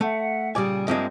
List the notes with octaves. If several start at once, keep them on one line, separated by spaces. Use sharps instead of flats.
A3 E5 F#5
A#2 C#3 G3 D5 G#5 D#6
G2 F3 G#3 A#3 C4 E5